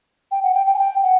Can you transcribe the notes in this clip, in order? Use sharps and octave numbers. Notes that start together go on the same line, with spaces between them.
G5
F#5
G5
G5
G#5
G5
F#5